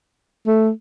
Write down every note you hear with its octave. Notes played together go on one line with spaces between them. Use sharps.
A3